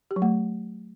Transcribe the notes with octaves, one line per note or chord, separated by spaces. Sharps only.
G4
F#3
A3